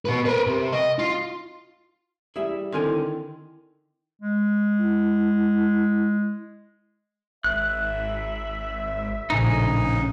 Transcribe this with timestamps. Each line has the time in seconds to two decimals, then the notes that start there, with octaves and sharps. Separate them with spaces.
0.05 B2 B4
0.25 A#4 B4
0.47 C3
0.72 D#5
0.99 F4
2.36 G3 E4 G#4 E5
2.73 D3 D#3 C4 E4 A4 G#5 C6
4.22 G#3
4.78 E4
7.44 G#1 E5 F#6
9.30 A#1 A2 C#3 D#4 G#5